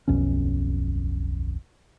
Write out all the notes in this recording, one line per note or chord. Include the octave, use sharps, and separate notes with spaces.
D1 B1 F2 C#4